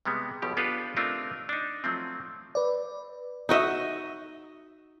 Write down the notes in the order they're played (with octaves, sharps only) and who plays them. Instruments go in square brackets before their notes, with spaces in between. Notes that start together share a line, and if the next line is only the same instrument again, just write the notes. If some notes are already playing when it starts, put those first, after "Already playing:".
[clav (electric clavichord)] C3 G3 G#3 B3
B1 B2 F3 G4
B3 D4 F4 G4 A4 B4
A3 C4 D4 D#4 F4 A#4
D4 D#4
F3 F#3 A3 C4
[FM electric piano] B4 D5
[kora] D#4 F#4 D#5 E5